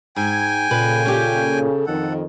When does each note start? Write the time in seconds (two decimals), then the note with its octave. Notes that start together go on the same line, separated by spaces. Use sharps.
0.16 G#2 G5 G#5 G#6
0.71 A#2 C#3 A4 B4
1.05 C#4 G4
1.86 F2 D#3 A4 F#5